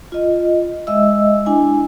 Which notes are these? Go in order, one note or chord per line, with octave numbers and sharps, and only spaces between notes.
F4 D#5
G#3 D#5 E5 E6
D4 E4 G#5